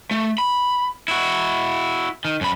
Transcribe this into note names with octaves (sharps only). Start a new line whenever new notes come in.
A3
B5
E4 F#4
D#3
F#2 B5